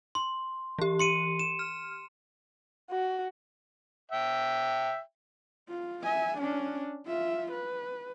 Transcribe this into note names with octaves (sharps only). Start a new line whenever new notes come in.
C6
E3 G4
C6 C#7 D#7
E7
F6
F#4
E5 G5
F4
E5 G#5
C#4 D4
F4 E5
B4